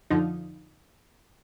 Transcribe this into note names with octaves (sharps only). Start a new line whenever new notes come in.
F2 D3 F3 D#4